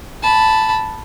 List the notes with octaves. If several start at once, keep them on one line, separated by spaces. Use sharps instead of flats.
A5 B5